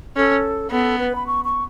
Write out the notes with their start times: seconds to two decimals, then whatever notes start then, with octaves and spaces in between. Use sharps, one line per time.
0.16 C#4 A4
0.71 B3 A4
0.99 B4
1.15 B5
1.27 C#6
1.45 C#6